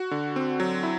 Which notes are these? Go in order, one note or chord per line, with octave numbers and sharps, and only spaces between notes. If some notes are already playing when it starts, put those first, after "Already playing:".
Already playing: F#4
D3
C4
F#3
E4